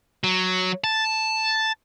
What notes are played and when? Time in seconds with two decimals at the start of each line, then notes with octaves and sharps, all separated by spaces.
0.24 F#3
0.84 A5